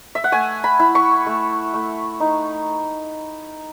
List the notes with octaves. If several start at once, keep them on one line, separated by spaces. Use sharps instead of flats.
E5
F#5
A3 G#5
B5
E4
C#6
A3
A3
D#4